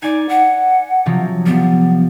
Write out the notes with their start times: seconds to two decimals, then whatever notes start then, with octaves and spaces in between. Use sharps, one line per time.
0.02 D#4 D5 G#5
0.29 F#5
1.06 C3 F3 F#3
1.46 F3 G3 B3